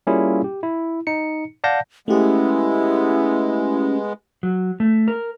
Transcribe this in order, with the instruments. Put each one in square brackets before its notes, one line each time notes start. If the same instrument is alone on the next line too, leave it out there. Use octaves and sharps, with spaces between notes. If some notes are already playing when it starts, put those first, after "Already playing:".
[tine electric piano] G3 A#3 C#4 E4 F4 G#4
G4
E4
D#4 C#7
D5 F5 F#5 A5 G6 A#6
[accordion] G#3 B3 [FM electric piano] A3 G4 [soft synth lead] C#4 [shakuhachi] E4
[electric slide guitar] F#3
A3
A#4